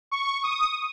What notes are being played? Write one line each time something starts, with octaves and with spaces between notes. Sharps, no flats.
C#6
D#6